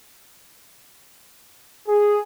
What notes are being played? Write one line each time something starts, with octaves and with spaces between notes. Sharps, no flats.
G#4